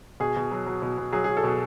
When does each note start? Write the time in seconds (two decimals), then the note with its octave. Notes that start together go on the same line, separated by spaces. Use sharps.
0.20 B2 G#4
0.37 B2
0.51 F#3
0.67 F#3
0.82 B2
0.98 B2
1.12 F#3 G#4
1.24 F#3 G#4
1.37 A4
1.44 B2 G#4